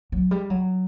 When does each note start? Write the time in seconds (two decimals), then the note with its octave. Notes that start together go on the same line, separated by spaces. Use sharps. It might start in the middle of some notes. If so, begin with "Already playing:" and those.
0.12 F#3
0.31 G3
0.50 F#3